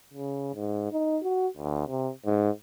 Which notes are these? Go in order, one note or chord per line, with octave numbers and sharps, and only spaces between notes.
C#3
G#2
D#4
F#4
D2
C3
G#2